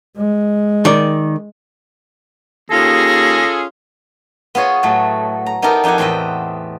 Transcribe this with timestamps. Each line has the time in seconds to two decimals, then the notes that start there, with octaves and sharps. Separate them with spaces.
0.18 G#3
0.85 D#3 D5
2.70 D#2 C#4 F4 G#4 A4 A#6
4.55 B3 F4 G#4 C#5 D#5
4.83 A2 F#3 A3
5.46 A#5
5.62 B3 D#4 E4 G4 A4 A#4
5.84 F2 D#4 G4 F#5 G#5
5.98 E2 A2 C4 B4 D#5